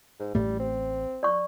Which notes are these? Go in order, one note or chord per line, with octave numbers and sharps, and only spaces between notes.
G#2
A1 A2 G3 A3
C4
D5 C#6